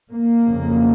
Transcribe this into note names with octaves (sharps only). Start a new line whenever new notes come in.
A#3
F2 C#3